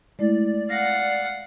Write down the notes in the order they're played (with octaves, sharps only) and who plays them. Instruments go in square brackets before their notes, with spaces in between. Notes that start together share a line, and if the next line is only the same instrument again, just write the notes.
[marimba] G#3 A3 E4 [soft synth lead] D5
[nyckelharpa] F5 F#5 [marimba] A#6